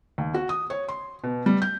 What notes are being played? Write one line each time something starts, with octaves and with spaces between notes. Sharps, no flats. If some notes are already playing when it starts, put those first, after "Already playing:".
D#2
F#4
D#6
C#5
C6
B2
G3
G6